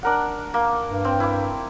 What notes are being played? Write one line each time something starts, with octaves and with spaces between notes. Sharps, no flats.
D4 A#4 F#5
A#3
G2
C4 G5
E4 D6